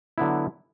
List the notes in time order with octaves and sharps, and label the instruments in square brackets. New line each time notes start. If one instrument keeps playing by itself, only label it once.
[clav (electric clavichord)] D3 F#3 B3 E4